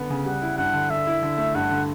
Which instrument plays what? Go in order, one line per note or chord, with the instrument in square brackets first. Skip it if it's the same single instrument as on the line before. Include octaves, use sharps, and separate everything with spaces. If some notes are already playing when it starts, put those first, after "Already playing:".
Already playing: [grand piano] D3 B3
C#3
[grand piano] G3 [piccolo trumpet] F#5
[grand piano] E4
[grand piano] G2 [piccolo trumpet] F#5
[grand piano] D3
[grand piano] D3 [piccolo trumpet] E5
[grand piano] E4
D3
A3
[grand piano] G2 [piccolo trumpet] F#5
[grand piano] D3